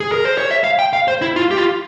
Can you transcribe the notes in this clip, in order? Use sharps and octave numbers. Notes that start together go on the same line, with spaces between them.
G#4
A#4
C5
C#5
E5
F5
G5
F5
C5
E4
F4
G4
F4